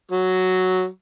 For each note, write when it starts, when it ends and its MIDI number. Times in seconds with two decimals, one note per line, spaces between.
0.11 0.87 54